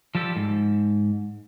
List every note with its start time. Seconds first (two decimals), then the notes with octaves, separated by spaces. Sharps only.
0.15 F3 G3 G4 A4
0.36 G#2